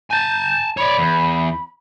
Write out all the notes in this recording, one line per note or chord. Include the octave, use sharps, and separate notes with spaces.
G#5 A5 G6
C#5 D5 B5
E2